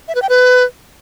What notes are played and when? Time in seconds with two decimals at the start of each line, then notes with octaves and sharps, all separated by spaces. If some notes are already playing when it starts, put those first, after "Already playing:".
0.08 E5
0.15 B4
0.22 G5
0.29 B4